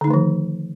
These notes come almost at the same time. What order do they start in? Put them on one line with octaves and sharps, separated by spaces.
D3 D#4 A3 D#3 F3